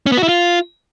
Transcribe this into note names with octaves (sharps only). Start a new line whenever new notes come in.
C#4
B3
F#4
E4
F4